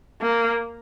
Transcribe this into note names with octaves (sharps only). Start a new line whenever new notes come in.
A#3